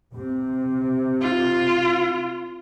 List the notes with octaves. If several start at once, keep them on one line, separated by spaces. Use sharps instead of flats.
C3
F4